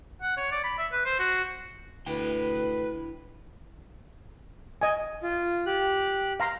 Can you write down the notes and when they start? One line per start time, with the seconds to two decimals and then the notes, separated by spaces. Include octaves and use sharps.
0.22 F#5
0.37 C#5
0.52 D5
0.64 B5
0.78 E5
0.92 B4
1.05 C5
1.19 F#4
2.06 D2 E4 B4 G5 F#6
4.81 D#5 G#5
5.23 F4
5.66 G4 F#6
6.40 F5 A#5 C6